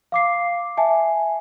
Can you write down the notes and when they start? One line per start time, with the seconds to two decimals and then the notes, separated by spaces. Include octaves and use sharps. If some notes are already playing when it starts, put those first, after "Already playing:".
0.12 F5 D6 C7
0.77 E5 G#5 A5